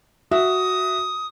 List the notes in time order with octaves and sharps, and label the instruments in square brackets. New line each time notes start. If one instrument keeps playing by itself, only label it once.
[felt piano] F#4 E5 [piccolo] D#6